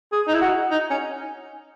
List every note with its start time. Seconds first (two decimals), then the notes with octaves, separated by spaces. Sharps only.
0.12 G#4
0.27 D#4
0.34 E4
0.41 F#4
0.71 D#4
0.90 C#4